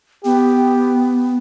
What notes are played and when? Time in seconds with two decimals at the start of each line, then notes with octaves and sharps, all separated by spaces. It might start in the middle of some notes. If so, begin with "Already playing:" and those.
0.25 B3 G4